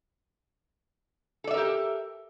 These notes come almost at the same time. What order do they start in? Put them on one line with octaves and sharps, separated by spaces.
A4 D5 E5 A#4 G4